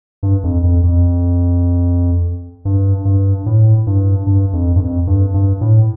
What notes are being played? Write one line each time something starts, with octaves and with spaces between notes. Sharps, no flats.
G2
F2
F2
F2
G2
G2
A2
G2
G2
F2
G2
F2
G2
G2
A2